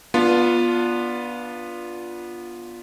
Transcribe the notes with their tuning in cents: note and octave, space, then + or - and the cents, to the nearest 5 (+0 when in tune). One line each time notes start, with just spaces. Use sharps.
B3 -25 D4 +0 F4 +0